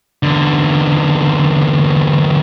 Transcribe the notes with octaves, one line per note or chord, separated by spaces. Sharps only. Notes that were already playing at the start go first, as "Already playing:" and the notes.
E2 D3